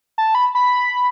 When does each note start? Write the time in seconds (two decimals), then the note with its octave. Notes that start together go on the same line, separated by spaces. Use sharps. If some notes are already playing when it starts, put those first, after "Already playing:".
0.18 A5
0.35 B5
0.55 B5